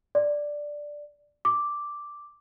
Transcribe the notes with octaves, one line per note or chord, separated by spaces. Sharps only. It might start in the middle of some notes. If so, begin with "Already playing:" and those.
D5
D6